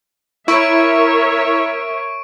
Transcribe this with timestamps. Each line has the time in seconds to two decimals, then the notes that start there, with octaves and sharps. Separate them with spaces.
0.48 E4 A#4 C#5 E5 C#6 D7